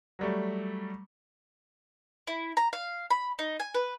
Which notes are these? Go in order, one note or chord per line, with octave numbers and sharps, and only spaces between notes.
F#3 G3 A3
E4
A#5
F5
B5
D#4
G#5
B4